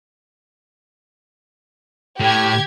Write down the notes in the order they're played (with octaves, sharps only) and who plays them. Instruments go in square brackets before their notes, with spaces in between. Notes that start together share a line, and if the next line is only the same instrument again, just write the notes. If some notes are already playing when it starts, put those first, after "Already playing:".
[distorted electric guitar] A2 [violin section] G4 G#6